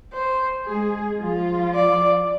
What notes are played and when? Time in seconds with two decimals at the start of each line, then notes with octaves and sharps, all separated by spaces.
0.13 C5
0.66 G#3 G#4
1.21 F3 F4
1.75 D5